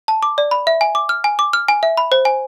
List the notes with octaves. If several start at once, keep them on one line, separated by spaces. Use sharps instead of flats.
A5
D6
D5
B5
E5
G#5
D6
F6
G#5
D6
F6
G#5
E5
B5
C5
G#5